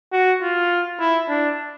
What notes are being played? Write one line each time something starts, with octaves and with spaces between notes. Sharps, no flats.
F#4
F4
E4
D4